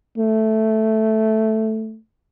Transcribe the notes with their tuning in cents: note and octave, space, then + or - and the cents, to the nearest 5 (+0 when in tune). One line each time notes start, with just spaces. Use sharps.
A3 +0